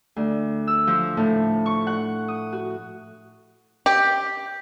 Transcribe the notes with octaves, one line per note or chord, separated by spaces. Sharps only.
D2
E6
F3
A2
C#6
F#5
D#6
F#4
G4